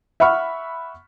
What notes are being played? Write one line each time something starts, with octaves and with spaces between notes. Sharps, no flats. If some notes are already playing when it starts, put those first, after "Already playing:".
E5 F#5 B5 C#6 F6